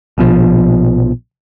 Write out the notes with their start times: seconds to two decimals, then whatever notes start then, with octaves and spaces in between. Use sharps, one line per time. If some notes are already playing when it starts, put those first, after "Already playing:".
0.18 A#1 B2 F3